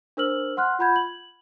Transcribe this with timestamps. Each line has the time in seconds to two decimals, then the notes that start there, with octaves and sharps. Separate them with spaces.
0.17 D4 A#4 C5 E6 F6 F#7
0.57 F#5 C6 F6 F#6
0.79 F4 F#5 B5 G6 G#6
0.96 F#7